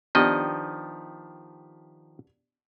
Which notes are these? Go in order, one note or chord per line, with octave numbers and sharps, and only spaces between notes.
D#3 F3 B3 D4 G4 D#5